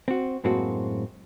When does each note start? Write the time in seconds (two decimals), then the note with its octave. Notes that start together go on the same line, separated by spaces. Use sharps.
0.08 C4 F#4
0.44 F#2 A2 G#3 A#3 C4 F#4